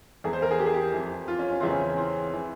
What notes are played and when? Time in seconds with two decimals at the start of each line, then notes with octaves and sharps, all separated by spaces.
0.24 E2 E3 G#4
0.33 C5
0.42 A#4
0.51 G#4
0.59 G4
0.66 G#4
0.74 G4
0.94 F2 E3
1.28 F4
1.39 C#4
1.51 C#4
1.60 E2 C#3 E3 C4
1.70 C#4
1.97 C4
2.34 E3